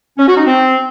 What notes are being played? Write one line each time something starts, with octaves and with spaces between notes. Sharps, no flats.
C#4
F#4
D#4
C4